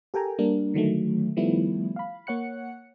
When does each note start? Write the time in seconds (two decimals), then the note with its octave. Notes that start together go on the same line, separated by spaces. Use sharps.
0.14 G4 A4 A#4 G5 G#5 A#5
0.39 G3 A#3 D4 A#4
0.74 D3 D#3 F#3 A3
1.36 D#3 F3 G3 A3 B3 E4
1.96 F5 B5
2.27 A#3 C#5 F#5 F#6 C#7